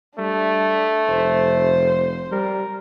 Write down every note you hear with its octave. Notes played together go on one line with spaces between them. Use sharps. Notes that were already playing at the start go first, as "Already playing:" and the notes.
G3 A3 D4
F1 C5
G3 A#4